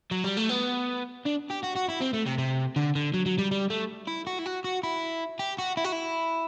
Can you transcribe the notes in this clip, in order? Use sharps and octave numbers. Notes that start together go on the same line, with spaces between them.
F#3
G3
A3
B3
D4
G4
F#4
F#4
E4
C4
A3
C3
C3
D3
D3
F#3
F#3
G3
G3
A3
E4
F#4
E4
F#4
F#4
E4
G4
F#4
E4
F#4
E4